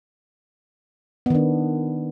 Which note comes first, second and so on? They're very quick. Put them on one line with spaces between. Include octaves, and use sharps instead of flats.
B3 D#3 D4